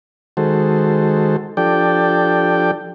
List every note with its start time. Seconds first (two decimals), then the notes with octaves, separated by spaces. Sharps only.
0.37 D#3 G#3 F#4 A4 C5
1.57 F3 D4 G4 A4 D5 G5